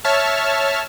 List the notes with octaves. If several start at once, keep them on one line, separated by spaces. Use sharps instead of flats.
C#5 E5 A5 F6